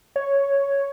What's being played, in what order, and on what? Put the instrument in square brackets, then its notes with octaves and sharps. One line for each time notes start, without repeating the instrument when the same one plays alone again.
[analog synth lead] C#5